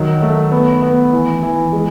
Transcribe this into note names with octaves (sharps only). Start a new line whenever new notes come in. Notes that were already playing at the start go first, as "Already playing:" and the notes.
Already playing: D#3 F#3
A3
B3
B3
E3
E3
G#3